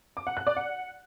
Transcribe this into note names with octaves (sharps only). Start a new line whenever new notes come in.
D6
F#5
F#6
D5
F#5